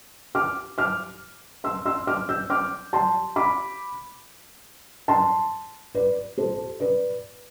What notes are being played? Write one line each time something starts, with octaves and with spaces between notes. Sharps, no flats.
D6 F6
D6 F6
C6 E6
C6 E6
D6 F6
E6 G6
D6 F6
A5 C6
B5 D6
A5 C6
B4 D5
A4 C5
B4 D5